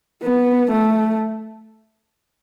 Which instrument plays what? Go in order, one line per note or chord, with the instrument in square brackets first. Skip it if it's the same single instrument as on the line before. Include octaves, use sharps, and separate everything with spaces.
[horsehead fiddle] B3
A3